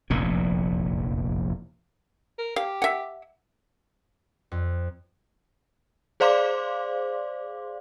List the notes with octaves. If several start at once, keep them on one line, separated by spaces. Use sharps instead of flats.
F1 A#1 E2 A#2
A#4
G4 F5
E5 F#5
F2
G#4 C5 D5 F5 C6 D6